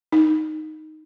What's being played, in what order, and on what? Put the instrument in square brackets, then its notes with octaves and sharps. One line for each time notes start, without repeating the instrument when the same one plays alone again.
[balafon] D#4